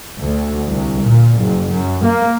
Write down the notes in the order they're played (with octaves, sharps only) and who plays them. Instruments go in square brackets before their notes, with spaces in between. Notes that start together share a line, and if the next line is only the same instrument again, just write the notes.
[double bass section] D2
C2
A#2
F#1
F#2
A#3